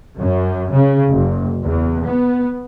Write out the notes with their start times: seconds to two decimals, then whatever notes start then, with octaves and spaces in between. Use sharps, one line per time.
0.18 F#2
0.71 C#3
1.10 F#1
1.64 E2
2.04 B3